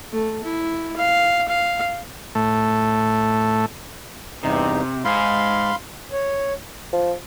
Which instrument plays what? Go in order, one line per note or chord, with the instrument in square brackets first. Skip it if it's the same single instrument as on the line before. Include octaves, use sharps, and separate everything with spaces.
[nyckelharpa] A3
E4
F5
F5
[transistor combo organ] A2 A3
[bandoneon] E2 G2 D#4 [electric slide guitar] C3
[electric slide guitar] G#2 G#4 [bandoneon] F5 B5 C6
[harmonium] C#5
[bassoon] F3